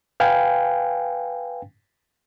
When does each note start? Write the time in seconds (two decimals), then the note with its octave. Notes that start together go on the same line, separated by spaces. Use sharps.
0.20 B4 F5 G5 G#5